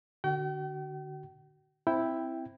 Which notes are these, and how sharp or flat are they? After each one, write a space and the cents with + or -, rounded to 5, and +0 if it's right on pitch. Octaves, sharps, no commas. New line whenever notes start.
D3 +20 F#4 +25 G5 -40
C4 +0 E4 +0 G5 +0